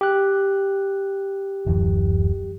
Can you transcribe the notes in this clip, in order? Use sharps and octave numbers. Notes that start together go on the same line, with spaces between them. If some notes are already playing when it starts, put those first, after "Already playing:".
G4 F#6
D1 F#2 E3